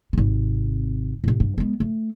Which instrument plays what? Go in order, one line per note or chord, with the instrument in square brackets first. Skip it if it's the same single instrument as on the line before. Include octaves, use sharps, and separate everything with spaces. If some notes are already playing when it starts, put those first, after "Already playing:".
[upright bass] G#1 C3
A2 C3
G2
G#3 B3
A3